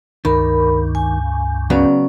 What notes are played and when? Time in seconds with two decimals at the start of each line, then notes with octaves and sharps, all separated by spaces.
0.25 C#2 G2 D#3 A#4 B5
0.95 G#5
1.70 C#3 F#3 B3 C#4 D5